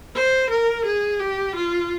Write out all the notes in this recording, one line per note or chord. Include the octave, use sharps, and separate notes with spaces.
C5
A#4
G#4
G4
F4